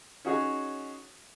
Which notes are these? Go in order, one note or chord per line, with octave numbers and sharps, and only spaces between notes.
C#4 D#4 F#4 G#4 C#5